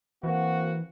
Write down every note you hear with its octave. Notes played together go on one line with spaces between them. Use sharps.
E3 A#3 C4 F#4